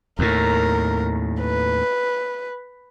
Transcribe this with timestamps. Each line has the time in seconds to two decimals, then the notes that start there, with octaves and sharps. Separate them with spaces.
0.19 D#2 A2 A#4
1.40 B4